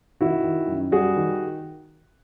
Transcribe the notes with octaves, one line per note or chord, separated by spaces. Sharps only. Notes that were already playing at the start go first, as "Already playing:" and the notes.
D#3 E4 F#4
D#3
F#2
G3 F#4 G#4
D#3